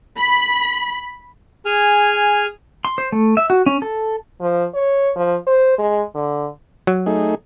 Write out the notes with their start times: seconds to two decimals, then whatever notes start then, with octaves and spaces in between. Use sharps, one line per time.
0.18 B5
1.66 G#4 G#5 F6
2.85 C6
2.98 C5
3.12 A3
3.37 E5
3.50 F#4
3.66 C#4
3.82 A4
4.41 F3
4.75 C#5
5.16 F3
5.47 C5
5.79 G#3
6.15 D3
6.87 F#3
7.06 A3 D#4 G#4